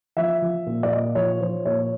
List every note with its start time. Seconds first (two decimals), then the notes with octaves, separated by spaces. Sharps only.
0.17 F3 E5
0.42 F3
0.66 A#2
0.83 D5
0.91 A#2 D#5
1.15 F3 C#5
1.41 F3 C5
1.65 A#2 C#5